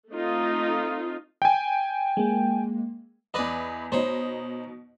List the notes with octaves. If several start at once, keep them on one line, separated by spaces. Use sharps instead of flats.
A3 C4 D#4 F4
G5 G#5
G#3 A#3
E2 B4 D5 D#5 B5
B2 D#4 C5 C#5 B5